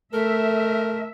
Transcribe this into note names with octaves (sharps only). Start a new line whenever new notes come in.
A3 A4 A#4 E5